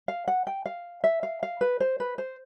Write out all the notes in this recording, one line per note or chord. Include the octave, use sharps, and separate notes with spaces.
F5
F#5
G5
F5
E5
F5
F5
B4
C5
B4
C5